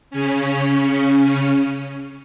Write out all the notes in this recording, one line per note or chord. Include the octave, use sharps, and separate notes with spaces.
C#3 C#4